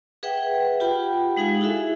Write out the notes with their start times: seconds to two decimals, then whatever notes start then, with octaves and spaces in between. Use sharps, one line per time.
0.23 G#4 B4 E5 F#5 G5
0.80 F4 G4 F#5 G5 B5
1.37 G#3 D#4 G#4 F5 G#5
1.61 E4 F#4 G#4 A4 E5